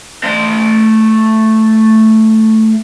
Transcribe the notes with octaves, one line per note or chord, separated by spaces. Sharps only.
A3 C6